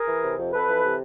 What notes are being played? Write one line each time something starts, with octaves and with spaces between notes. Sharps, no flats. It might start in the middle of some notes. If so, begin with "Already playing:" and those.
Already playing: G#4 A#4
E3
C3
F2
F2 A4 B4
E3
C3